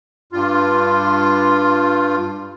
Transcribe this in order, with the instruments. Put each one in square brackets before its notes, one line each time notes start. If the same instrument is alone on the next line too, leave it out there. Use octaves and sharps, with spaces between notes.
[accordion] G2 F4